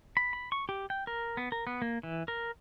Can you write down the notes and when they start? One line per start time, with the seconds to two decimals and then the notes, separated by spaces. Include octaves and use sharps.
0.17 B5
0.33 B5
0.52 C#6
0.69 G4
0.90 G5
1.07 A#4
1.37 B3
1.52 A#4
1.67 B3
1.82 A#3
2.03 E3
2.28 A#4